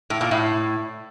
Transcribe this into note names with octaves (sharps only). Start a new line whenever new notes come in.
A2
A#2
A2